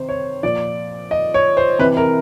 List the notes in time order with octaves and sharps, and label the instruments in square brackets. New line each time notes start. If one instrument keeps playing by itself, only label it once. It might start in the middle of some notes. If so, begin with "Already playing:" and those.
Already playing: [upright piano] C3 D#3 C5
C#5
A#2 F3 D5
D#5
C#5
C5
C3 E3 B4
A#4